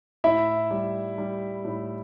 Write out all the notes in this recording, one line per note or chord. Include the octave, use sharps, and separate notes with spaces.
A2 E4 E5
G3
G3
A2